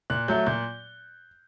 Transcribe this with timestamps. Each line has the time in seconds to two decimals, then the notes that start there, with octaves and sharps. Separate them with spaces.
0.10 A#2 F#6
0.28 F#3 A3 G6
0.47 A#2 G6